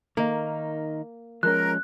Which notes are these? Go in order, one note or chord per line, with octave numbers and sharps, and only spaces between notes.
D#3 A#3 D#4
F3 G#3 C#4 A#4 F#6